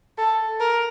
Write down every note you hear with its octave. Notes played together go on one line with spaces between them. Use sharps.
A4
A#4